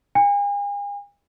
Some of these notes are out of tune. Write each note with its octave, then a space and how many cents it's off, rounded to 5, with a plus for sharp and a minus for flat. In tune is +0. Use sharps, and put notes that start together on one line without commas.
G#5 -45